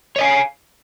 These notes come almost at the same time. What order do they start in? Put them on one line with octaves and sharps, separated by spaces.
C#5 D#5 G#5 F5